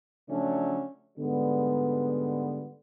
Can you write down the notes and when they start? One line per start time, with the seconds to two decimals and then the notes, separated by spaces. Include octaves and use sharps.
0.29 C#3 F3 F#3 A3 C#4 D4
1.18 G#2 D3 G3 G#3 B3